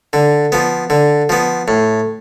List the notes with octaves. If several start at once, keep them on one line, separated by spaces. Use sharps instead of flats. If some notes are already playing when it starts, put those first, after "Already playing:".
D3
F3 B3
D3
F3 B3
A2